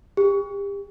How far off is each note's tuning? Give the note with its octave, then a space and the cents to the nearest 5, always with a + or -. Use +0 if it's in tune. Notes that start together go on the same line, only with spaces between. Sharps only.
G4 +35